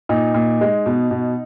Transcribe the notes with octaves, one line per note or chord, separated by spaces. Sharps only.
A#2 D#4
A#2
G#3
B2
B2